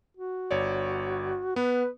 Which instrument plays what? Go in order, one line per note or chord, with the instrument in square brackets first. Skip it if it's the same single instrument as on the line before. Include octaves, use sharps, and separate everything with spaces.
[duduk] F#4
[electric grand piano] G1 C#5 D5
[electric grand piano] B3 [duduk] B4